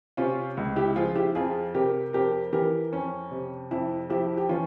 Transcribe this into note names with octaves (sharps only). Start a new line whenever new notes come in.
C3 C#4 F4
C#2
E4 G4
F3 F4 G#4
E4 G4
F2 F4 G#4
C3 G4 A#4
F2 G4 A#4
E3 G4 A#4
F2 C#4
C3
F2 E4
F3 E4 G4
G4
E3 C#4 F4